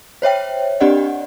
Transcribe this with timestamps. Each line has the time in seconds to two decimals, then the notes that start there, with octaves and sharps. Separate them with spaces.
0.22 C5 C#5 E5 G5
0.80 C4 D4 G4 D5 D#5 F#5